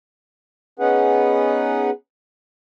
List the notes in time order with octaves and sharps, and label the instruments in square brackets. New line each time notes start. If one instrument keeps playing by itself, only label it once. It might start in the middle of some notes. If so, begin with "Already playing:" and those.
[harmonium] B3 C#4 D#4 G#4 B4 F#5